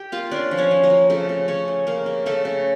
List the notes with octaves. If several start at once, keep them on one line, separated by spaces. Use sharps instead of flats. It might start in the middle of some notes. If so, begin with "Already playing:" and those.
Already playing: G4 G5
A#3 F4 F5
C#4 D4 D5
F3
C#4 C#5
F3
A#3 A#4
F3
C#3 A3 A4
C#3
C#3 C#4 C#5
A3
C#3 A#3 A#4
C#3
C#3 A3 A4
C#3